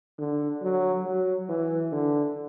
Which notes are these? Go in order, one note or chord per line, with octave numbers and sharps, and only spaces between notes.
D3
F#3
F#3
E3
D3